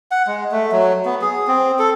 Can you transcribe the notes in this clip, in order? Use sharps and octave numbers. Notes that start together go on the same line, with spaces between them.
F#5
G#3
A3
F#3
B3
G#4
C4
A4